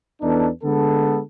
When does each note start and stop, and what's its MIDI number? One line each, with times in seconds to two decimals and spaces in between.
0.22 0.49 40
0.22 0.49 59
0.22 0.49 62
0.22 0.49 63
0.22 0.49 69
0.64 1.21 50
0.64 1.21 56
0.64 1.21 59
0.64 1.21 69